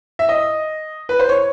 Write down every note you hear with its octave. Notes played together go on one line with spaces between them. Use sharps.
E5
D#5
B4
C5
C#5